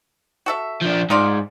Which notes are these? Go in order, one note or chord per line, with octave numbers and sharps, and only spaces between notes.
F#4 A4 E5
F3 D4
G#2 D#4 F4 D5